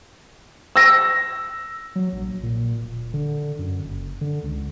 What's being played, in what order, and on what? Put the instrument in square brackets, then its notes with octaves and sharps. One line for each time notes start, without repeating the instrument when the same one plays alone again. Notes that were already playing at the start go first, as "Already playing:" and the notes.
[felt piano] E6 A#6
[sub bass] F#3
A#1
A#2
D1
D3
F#2
F#1
D3
C#2